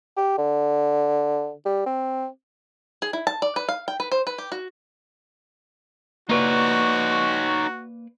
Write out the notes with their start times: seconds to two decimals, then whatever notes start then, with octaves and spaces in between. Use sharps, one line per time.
0.17 G4
0.38 D3
1.65 G3
1.86 C4
3.02 G#4
3.13 E4
3.27 A5
3.42 D5
3.56 B4
3.69 F5
3.88 G5
4.00 B4
4.12 C5
4.27 B4
4.38 G4
4.52 F#4
6.29 A#3 D#4 F#4 B4 C#5 D5